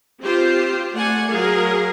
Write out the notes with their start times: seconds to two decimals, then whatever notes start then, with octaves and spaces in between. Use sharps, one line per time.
0.22 C4 F4 G4 C5
0.94 A3 D5 F#5 G#5
1.29 F#3 G#4 A#4 F5